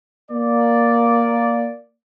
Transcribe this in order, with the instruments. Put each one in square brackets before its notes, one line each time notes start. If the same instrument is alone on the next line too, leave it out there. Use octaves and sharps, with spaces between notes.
[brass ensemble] A#3 D5